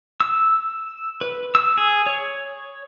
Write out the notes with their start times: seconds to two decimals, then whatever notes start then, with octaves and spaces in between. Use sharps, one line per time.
0.20 E6
1.21 B4
1.55 E6
1.77 G#4
2.06 C#5